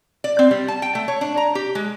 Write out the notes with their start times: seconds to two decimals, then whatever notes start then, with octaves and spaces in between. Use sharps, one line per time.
0.24 D5
0.39 C4
0.51 G3
0.68 A5
0.82 G5
0.95 A3
1.08 C#5
1.21 D4
1.37 A#5
1.55 G4
1.75 G#3